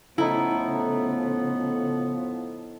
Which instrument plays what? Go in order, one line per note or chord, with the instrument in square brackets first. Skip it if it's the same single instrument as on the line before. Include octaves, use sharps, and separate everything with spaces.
[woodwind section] A2 F3 B3 [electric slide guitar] C#3 A3 [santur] D#4 A4 [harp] E4